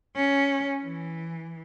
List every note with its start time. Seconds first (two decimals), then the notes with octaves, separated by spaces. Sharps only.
0.16 C#4
0.82 E3